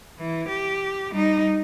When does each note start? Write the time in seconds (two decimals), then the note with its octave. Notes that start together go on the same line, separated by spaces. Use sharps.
0.18 E3
0.48 G4
1.11 G3 D#4